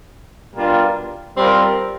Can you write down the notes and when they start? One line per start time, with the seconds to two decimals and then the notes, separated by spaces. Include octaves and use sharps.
0.55 B2 G3 A#3 D4 F4
1.35 G3 C4 F4 A#4